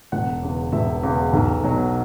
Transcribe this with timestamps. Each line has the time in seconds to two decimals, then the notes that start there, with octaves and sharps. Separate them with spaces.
0.12 E1 F#5
0.43 E2 C#3
0.72 E1 E5
1.03 E2 C#3
1.33 B1
1.64 B2 F#3